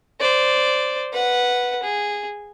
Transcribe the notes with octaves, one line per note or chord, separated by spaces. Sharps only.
C5 D5
B4 F#5
G#4